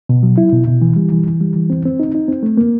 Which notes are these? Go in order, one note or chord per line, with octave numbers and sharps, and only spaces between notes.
B2
F#3
E4
B2
B2
E3
G3
E3
E3
G3
E3
C4
C4
D#4
D#4
C4
A3
A#3